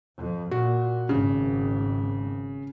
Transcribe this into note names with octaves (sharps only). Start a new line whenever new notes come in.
F2
A#2 F#4
G#1 C#3